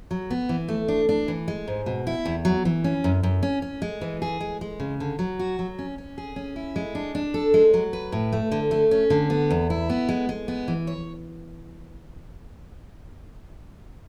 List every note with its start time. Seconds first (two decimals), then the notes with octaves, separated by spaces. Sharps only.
0.11 F#3
0.30 B3
0.49 E3
0.68 A3
0.88 D4
1.09 D4
1.28 E3
1.48 G#3
1.68 G#2
1.86 B2
2.07 E4
2.25 E2
2.45 F#3
2.65 E3
2.84 C#4
3.04 F#2
3.23 F#2
3.43 C#4
3.62 C#4
3.82 G#3
4.01 E3
4.22 G#4
4.41 G#3
4.61 G#3
4.80 C#3
5.00 D3
5.19 F#3
5.39 F#4
5.59 F#3
5.79 C#4
5.98 C#4
6.18 G#4
6.36 C#4
6.56 E4
6.76 G#3
6.95 D4
7.15 D4
7.34 A4
7.54 G#3
7.74 F#3
7.93 B4
8.12 A2
8.33 A3
8.51 D3
8.71 A3
8.91 C#4
9.10 D3
9.30 B3
9.51 E2
9.70 E4
9.90 B3
10.09 G#3
10.29 G#3
10.48 B3
10.68 E3
10.87 C#5